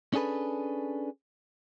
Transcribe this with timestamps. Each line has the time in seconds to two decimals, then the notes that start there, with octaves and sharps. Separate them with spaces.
0.14 C#4 D4 G#4 A4 B4